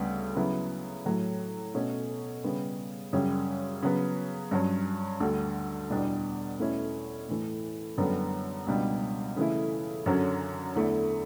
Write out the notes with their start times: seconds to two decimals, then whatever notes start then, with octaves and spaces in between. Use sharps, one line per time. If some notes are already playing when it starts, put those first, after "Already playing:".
Already playing: D2 C#3 G3 B3
0.35 C#3 F#3 B3 E4
1.06 A2 F#3 A3
1.74 B2 A3 C#4
2.44 C#3 G3 B3
3.13 F#2 C#3 G3 C#4
3.82 C#3 F#3 B3
4.51 G2 F#3 C#4
5.20 D2 D3 G3
5.90 E2 B2 G3 D4
6.59 E2 B2 A3 C#4 E4
7.28 A2 E3 A3
7.97 F#2 D3 G3 B3
8.67 C#2 B2 G3 D4
9.36 C#3 E3 A3 E4
10.06 F#2 D3 F#3 C#4
10.75 E2 D3 A3 E4